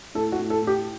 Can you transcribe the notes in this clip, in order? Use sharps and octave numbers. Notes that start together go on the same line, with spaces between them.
A2 A4
F#4
A2
A4
A2
G4